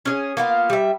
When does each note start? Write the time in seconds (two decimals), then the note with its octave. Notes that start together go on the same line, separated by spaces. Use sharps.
0.05 C#4 G#4
0.37 A#3 B3 F4
0.70 G3 E5